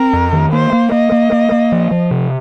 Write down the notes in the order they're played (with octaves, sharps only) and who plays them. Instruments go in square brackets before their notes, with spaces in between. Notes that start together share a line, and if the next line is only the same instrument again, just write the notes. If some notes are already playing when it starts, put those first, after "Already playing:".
Already playing: [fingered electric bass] C4 [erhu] A#4
[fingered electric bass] F2
D#3
[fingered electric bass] A#3 [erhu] C5
[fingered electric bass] A#3
[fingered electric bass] A#3 [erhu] D#5
[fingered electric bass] A#3
A#3
A#3
F3
F3
C3